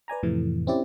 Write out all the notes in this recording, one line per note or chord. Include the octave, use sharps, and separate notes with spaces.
B4 D5 G#5 A#5
F2 A2 C3 E3 A3
C4 C#4 E4 G4 D5